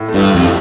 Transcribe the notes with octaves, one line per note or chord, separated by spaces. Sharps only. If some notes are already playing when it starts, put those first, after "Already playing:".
Already playing: A2
A3
G2
A2
F2 G4